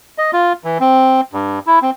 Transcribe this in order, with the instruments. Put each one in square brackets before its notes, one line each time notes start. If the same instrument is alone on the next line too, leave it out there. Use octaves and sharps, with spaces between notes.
[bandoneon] D#5
F4
E3
C4
G2
E4
C4